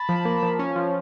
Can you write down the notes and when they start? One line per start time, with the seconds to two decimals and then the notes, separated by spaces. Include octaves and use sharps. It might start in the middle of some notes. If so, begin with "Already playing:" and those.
Already playing: A5 B5
0.09 F3
0.25 A#3
0.42 F3
0.59 C#4
0.76 F3